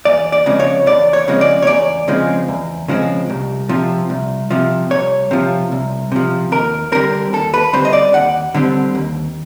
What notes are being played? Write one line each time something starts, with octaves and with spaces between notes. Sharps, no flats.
E2 D5
D5
C#3 F3 G#3 C4
C#5
E2 D5
C#5
C#3 F3 G#3 C4
D5
C#5
E2 D5
C#3 F3 G#3 C4
E2
C#3 F3 G#3 C4
C2
C3 F3
C2
C3 F3
C2 C#5
C3 F3
C2
C3 F3
D#2 A#4
D3 G3 C4 A#4
D#2 A4
B4
D3 G3 C4 C5
D#5
D5
D#2 F#5
D3 G3 C4
D#2